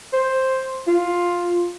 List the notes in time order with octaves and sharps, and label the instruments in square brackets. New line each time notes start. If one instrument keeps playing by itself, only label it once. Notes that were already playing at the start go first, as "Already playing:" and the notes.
[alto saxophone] C5
F4